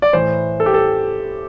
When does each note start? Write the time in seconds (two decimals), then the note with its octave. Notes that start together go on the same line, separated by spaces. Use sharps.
0.02 D5
0.13 A2 E3 C5
0.60 A4
0.66 G4
0.74 A4